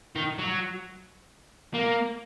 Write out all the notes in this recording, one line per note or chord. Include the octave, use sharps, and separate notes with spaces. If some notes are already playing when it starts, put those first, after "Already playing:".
D#3
F#3
A#3